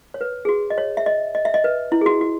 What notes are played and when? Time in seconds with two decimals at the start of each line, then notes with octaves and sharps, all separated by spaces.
0.14 C#5
0.21 B4
0.45 G#4
0.49 F#4
0.70 D#5
0.78 C#5
0.97 E5
1.06 D#5
1.35 D#5
1.45 E5
1.54 D#5
1.64 B4
1.92 E4
2.01 G#4
2.06 F#4
2.21 F#4